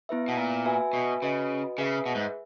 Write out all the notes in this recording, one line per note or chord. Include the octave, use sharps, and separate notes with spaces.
B3 E4 B4 E5
B2
A#2
F#4 B4 E5 G#5
B2
C#3 F#4 B4 D#5
C#3 G#4 B4 E5
B2
G#2